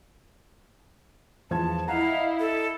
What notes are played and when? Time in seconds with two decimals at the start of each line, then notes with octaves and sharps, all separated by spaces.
1.51 E2 F3 A5 G#6
1.88 E4 D#5 F5 F#5 A#5
2.40 A4